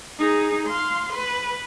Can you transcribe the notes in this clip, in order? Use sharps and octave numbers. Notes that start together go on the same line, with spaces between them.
D#4 G#4
F5 C6
B4